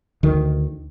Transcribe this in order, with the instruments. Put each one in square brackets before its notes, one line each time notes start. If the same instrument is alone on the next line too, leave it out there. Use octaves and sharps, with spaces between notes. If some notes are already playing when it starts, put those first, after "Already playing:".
[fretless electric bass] D2 D#3